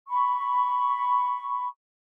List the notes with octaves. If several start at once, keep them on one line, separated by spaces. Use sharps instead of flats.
B5 C#6